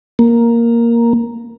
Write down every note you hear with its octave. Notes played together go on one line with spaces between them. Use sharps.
A#3